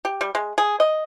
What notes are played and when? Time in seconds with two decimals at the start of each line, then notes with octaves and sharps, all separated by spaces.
0.05 G4
0.21 G3
0.35 G#3
0.58 G#4
0.80 D#5